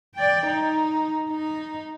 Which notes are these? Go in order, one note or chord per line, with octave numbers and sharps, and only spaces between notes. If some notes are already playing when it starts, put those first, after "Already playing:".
D5 G5
D#4
D#4